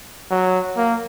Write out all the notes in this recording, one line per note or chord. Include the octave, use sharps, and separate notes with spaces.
F#3
A#3